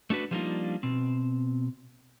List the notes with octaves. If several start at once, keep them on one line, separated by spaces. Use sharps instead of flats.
A3 D4 F#4 B4
F3 G3 A#3 D4 D#4 F4
B2 C4